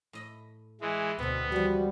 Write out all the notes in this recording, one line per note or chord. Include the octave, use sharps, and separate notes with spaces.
A2 D#5 B5
E3 G#3
D2 B2 B3 C4 A4
E2 F3 G3 F#4